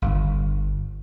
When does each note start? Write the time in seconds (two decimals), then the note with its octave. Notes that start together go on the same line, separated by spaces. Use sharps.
0.02 G1